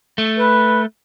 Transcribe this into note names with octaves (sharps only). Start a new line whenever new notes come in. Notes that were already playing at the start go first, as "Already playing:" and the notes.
A3
B4